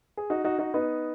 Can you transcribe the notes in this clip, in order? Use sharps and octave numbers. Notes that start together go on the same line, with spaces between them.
G#4
D#4 F#4
D#4 F#4
D#4 F#4
B3 D#4